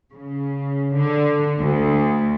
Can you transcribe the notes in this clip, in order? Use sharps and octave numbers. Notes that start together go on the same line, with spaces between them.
C#3
D3
D2